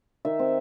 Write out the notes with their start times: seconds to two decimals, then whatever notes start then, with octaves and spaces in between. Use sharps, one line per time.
0.25 D#3 E5
0.39 C4